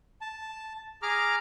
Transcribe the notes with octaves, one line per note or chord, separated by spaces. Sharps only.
A5
G#4 A#5 D6 F6